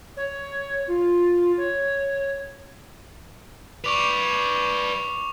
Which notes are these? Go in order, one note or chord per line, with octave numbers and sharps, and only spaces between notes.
C#5
F4
C#5
B4 D5 C#6 D6 F7